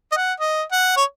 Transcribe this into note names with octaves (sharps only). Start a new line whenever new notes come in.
D#5
F#5
D#5
F#5
C#5